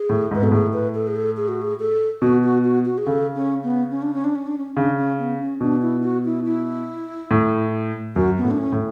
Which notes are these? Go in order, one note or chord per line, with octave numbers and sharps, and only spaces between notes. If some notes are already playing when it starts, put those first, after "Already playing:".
Already playing: G#4
A2
G#2 B4
B2 A4
A2 G#4
B4
A4
G#4
A4
G#4
F#4
G#4
A4
B2 F#4
F#4
F#4
F#4
G#4
C#3 A4
C#4
B3
C#4
D4
C#4
D4
C#4
D4
C#4
C#3 D4
C#4
B3
C#4
B2 D4
E4
F#4
E4
E4
A2
F#2 F#4
B3
A2
D4
C#4
A2